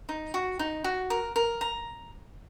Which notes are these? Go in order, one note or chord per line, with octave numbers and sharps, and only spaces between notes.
D#4
F#4
D#4
F#4
A#4
A#4
A#5